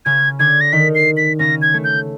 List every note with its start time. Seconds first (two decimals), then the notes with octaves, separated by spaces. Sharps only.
0.05 C#3 C#4 G#6
0.39 D3 D4 G#6
0.61 A#6
0.72 D#3 D#4 B6
0.95 C7
1.17 B6
1.39 C#3 C#4 A#6
1.62 G#6
1.74 A3
1.84 G6